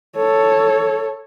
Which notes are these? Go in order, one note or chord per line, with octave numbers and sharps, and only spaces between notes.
A4 C#5